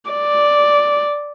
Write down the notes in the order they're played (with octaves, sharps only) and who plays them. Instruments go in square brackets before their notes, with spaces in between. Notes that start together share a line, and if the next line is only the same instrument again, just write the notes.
[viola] D5